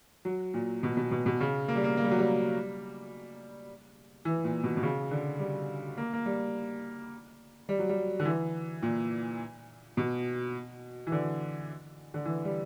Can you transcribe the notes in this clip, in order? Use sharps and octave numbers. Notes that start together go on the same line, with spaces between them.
F#3
A#2
B2
B2
B2
B2
C#3
A#3
G3
A#3
A#3
G3
F#3
G3
E3
A#2
B2
B2
C#3
D3
G3
A#3
A#3
G3
G3
F#3
G3
D3
E3
A#2
B2
E3
D3
D3
E3
G3